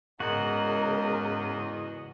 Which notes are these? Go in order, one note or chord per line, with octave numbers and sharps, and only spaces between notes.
E2 G#2 C#3 F#4 A#4 D#5 F#5